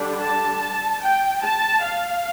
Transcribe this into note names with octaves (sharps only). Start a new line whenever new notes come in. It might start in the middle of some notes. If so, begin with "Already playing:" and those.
Already playing: D3 G3 D4
A5
G5
A5
F5